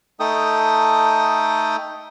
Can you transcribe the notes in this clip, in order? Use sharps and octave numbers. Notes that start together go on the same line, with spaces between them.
A3 D#4 A4 G5 D#6